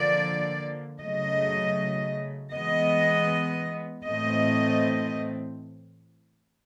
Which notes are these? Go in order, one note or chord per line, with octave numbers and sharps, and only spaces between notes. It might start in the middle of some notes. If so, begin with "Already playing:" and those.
Already playing: D3 F3 A#3 D5
C#3 F#3 A3 D#5
E3 G#3 B3 D#5
A2 E3 A3 C4 D#5